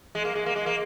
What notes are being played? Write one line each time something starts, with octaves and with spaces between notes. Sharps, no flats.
G#3
A#3
G#3
A#3
G#3
A#3